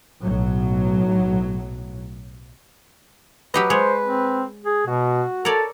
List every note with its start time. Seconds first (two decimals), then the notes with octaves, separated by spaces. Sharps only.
0.21 B1 A2 F#3
3.54 F#3 G4 B4 D#5
3.70 G#3 C5 C#5
4.06 C4
4.65 G#4
4.87 B2 F#4
5.45 A4 A#4 C#5 D5